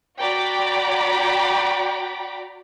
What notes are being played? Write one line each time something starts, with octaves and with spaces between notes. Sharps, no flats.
F#4 D5 G5 A#5 B5 D6